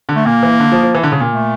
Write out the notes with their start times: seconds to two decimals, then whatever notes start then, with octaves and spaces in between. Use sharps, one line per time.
0.09 D3
0.16 A3
0.26 A#2 A#3
0.43 E3
0.60 D3
0.72 F3
0.83 F3
0.95 E3
1.03 D3
1.12 C#3
1.20 A#2
1.30 A3